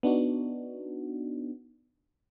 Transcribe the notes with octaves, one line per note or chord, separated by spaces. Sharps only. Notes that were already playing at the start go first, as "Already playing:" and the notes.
B3 D4 D#4 F#4